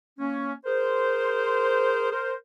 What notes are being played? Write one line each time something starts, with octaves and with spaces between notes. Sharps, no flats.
A#3 C#4
G#4 A#4 C5
A#4 C5